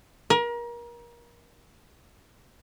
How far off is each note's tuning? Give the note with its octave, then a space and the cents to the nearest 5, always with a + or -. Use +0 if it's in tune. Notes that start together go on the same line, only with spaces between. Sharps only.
A#4 +30